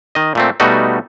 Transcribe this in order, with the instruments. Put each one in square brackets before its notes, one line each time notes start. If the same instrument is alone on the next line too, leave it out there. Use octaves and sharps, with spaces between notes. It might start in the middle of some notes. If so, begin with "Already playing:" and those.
[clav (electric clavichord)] D#3 D#5
A#2 A3 C4
B2 G3 A3 D#4 F#4